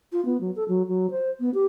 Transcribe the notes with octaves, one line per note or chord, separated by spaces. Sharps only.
F4
B3
F#3
A4
F#3
F#3
C5
B3
G4